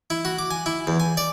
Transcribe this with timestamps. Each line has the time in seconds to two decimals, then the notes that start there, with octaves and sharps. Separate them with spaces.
0.10 E4
0.25 F#4
0.39 D6
0.51 G#5
0.66 E4
0.87 E2
1.00 G#5
1.17 D5